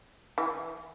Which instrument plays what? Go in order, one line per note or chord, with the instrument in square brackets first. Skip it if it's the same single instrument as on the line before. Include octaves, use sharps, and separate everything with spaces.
[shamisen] E3